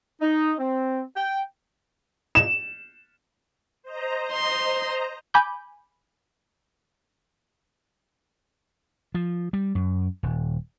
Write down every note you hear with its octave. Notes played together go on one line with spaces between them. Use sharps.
D#4
C4
G5
E7
C5 D#5 A#5
C6
G#5 B5 D6 G6
F3
G3
F#2
D#1